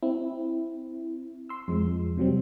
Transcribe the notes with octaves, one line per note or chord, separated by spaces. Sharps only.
C4 E4
C6 E6
F2 F3 G#3
C3 F#3 G3 C4